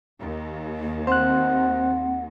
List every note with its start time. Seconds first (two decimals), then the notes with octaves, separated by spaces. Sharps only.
0.20 D#2
1.07 C4 C5 F#5 F#6